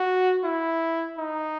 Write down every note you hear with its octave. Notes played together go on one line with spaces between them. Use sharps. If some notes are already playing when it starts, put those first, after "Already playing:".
Already playing: F#4
E4
D#4